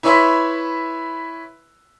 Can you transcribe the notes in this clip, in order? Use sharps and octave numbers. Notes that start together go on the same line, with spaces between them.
E4 B4 C#5 E5 B5 C6